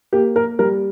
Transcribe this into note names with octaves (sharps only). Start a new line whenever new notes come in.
A#3 G4
A#4
G3 A#4